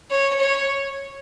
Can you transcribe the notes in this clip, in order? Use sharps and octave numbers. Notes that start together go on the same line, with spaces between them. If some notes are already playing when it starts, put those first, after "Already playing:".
C#5
C#5